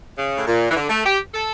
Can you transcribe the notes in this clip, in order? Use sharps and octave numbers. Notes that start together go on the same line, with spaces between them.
C#3
A2
A#2
E3
D3
A3
G4
A4